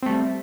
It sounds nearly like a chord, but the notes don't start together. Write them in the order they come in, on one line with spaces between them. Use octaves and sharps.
C4 A3 G3